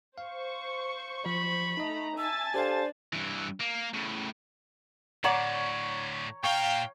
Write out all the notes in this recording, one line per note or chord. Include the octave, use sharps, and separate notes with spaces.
C5 F5 C#6
F3 B5
A3 D#4 D#5 A#5
E5 G#5 A5 E6 A6
D4 G4 A4 C5 F5
G2 E3
A#3
A2 C#3
A2 D3 C#5 D5 F#5 A#5 D6
A#2 F5 G5 A#5 C#6